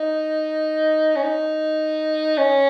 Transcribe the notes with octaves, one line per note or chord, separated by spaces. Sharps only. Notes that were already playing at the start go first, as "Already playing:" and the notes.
Already playing: D#4
C#4
D#4
C#4